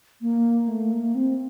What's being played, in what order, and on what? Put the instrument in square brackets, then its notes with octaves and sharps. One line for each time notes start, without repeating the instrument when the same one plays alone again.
[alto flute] A#3
A3
A#3
C4